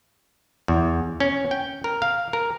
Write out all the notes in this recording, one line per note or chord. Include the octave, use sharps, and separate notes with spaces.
E2
C#4
G5
A#4
F5
A#4